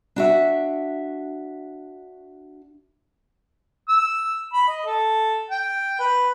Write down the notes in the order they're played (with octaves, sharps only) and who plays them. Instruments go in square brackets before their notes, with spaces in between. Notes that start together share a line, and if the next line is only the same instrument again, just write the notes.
[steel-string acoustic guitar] D4 F#4 E5
[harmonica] E6
B5
D#5
A4
G5
B4